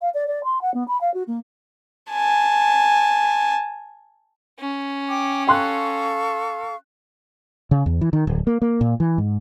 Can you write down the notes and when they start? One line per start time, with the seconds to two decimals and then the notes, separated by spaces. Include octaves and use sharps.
0.01 F5
0.14 D5
0.27 D5
0.44 C6
0.61 F#5
0.74 B3
0.88 B5
1.01 F5
1.14 F#4
1.27 A#3
2.11 G#5 A5
4.60 C#4
5.08 G5 D6
5.47 A4 F5 G5 C6 C#6 F#6
7.71 C#3
7.86 E2
8.01 E3
8.13 D#3
8.27 D1
8.47 A#3
8.62 A#3
8.81 A#2
9.00 E3
9.18 G#2